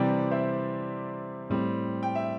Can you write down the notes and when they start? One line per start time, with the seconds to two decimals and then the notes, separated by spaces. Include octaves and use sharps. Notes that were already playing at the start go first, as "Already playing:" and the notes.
Already playing: C3 E3 G3 C4 D5 G5
0.31 C5 E5
1.50 A2 G3 C4
2.03 G5
2.15 E5